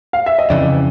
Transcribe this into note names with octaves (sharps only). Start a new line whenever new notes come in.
F5
E5
D#5
F2 C#3 E3 D5